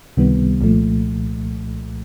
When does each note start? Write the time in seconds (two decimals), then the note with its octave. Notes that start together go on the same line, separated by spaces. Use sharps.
0.17 C#2 C3 D#3 G3 B3
0.61 C2 A#2 F3 A3